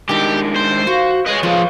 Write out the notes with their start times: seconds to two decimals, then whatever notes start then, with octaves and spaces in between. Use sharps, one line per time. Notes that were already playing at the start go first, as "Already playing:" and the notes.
0.09 D#3 G3 G#3 D4 E4 G4
0.56 C5
0.87 F4 F#4
1.26 G#4 B4 C#5 D#5
1.43 F3 G#3 F4